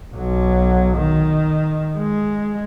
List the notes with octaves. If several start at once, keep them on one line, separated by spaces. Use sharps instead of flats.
B1 F#3
D#3
G#3